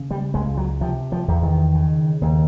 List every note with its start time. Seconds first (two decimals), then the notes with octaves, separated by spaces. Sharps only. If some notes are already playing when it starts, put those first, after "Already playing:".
Already playing: C#3
0.11 G3
0.34 C#2 G#3
0.57 F#3
0.81 C3 F3
1.12 F3
1.28 E2
1.43 D#3
1.75 C#3
2.21 D#2